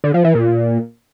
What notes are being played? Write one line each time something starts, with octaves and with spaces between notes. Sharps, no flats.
D3
F3
E3
A#2